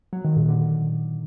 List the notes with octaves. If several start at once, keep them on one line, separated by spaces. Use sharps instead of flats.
F#3
D#3
A#2
D3